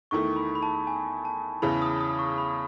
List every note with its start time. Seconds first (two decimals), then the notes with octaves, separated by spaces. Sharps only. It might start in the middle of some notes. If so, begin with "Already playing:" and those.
0.11 E2 D#3 A3 E4 C#6
0.36 B5
0.55 B5
0.63 A5
0.87 G#5
1.25 A5
1.62 E2 C#3 E3 B5
1.82 D#6
2.01 D#6
2.19 C#6
2.38 B5